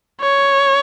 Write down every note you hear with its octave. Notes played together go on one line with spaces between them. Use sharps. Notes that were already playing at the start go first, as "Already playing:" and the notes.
C#5